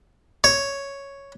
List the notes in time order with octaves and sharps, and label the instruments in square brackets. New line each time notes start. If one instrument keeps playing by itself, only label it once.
[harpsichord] C#5